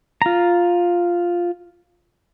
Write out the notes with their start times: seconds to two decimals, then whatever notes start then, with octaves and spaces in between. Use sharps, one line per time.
0.22 F4 A#5